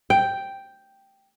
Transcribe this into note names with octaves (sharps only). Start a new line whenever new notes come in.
G5